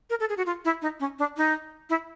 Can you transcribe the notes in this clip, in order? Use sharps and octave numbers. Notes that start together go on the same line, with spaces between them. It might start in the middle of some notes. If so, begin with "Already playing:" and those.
A#4
A4
G#4
F#4
F4
E4
D#4
C#4
D4
D#4
E4